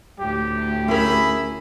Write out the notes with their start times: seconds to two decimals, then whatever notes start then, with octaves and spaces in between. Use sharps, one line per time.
0.20 D2 A2 G4
0.88 C#4 E4 G#4 A#4 B5